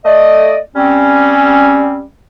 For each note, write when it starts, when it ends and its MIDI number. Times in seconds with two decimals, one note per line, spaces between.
0.05 0.57 57
0.05 0.57 74
0.05 0.57 75
0.76 2.03 55
0.76 2.03 60
0.76 2.03 61